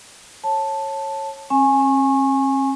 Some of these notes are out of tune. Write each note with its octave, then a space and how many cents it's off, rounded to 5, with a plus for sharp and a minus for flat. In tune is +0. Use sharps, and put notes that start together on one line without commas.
C#5 -20 A5 +0
C4 +45 G#5 +0 C#6 -30